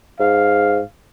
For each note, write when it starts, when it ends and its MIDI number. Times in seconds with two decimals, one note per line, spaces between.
0.20 0.80 44
0.20 0.85 77